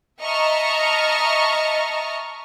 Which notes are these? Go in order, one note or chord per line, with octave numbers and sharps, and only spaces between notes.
D#5 E5 A5 A#5 C#6 F6